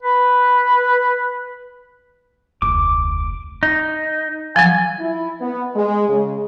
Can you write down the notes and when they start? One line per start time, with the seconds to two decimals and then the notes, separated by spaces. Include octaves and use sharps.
0.03 B4
2.62 F1 D2 D6
3.63 D#4
4.56 F3 F#3 G#5
4.99 E4
5.41 B3
5.76 G#3
6.09 C#3